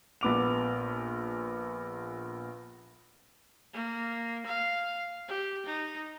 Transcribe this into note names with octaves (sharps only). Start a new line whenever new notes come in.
A#1 B3 D6 F7
A#3
F5
G4
D#4